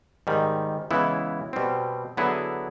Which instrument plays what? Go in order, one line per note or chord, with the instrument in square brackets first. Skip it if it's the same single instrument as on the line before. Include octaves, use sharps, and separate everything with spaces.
[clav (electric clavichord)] G#2 D#3 G3
C#3 E3 G#3 B3 E4
B2 G3 C4
D3 F#3 B3 E4 G#4